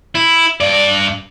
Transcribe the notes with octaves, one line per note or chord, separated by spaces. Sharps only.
E4
G2 D5